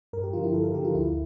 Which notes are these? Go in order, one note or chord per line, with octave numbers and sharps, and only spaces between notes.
G2 A#4
G4
D3 F3 F4
E4
G2 A4
A#4
D3 F3 G4
F4
D2 E4